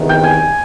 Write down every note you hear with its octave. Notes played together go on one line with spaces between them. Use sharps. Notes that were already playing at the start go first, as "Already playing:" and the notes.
Already playing: E2 C3 D#3
G5
G#5